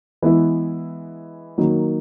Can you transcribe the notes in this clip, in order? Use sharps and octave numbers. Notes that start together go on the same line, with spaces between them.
E3 G#3 B3 E4
D#3 F#3 A#3